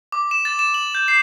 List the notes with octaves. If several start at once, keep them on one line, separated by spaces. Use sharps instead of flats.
D6
E7
A6
E7
F#7
G6
C7